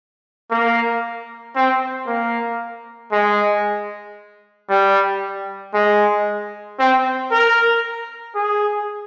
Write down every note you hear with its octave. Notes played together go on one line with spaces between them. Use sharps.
A#3
C4
A#3
G#3
G3
G#3
C4
A#4
G#4